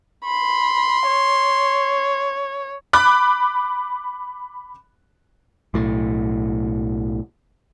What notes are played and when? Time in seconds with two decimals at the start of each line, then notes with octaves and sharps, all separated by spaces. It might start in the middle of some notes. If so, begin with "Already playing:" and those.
0.25 B5 C6
1.07 C#5
2.93 B5 D6 F#6
5.74 B1 A2